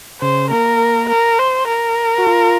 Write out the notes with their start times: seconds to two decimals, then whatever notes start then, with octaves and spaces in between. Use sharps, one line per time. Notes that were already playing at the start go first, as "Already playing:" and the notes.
0.22 C#3 C5
0.51 A#3 A#4
1.10 A#4
1.39 C5
1.68 A#4
2.18 F#4
2.27 F4